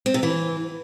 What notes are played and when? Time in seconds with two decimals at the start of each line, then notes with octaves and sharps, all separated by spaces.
0.06 C4
0.14 C3
0.23 E3